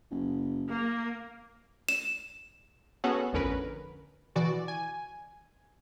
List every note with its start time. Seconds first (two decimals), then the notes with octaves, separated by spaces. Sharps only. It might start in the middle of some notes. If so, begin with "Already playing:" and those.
0.11 F#1
0.68 A#3
1.89 E7
3.04 B3 C#4 F#4 G#4 A4 F#5
3.33 A1 F2 D3 C#4 A#4 B4
4.35 B2 E3 F#4 D5
4.68 G#5